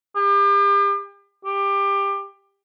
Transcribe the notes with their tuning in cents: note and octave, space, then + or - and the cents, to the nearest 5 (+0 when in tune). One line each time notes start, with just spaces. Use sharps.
G4 +35
G4 +20